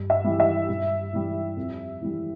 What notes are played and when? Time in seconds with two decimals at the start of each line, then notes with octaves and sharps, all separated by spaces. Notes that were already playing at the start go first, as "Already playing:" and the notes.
Already playing: G2
0.10 E5
0.24 E3 G3
0.40 E5
0.69 G2
1.13 E3 G3
1.56 F2
2.01 E3 G3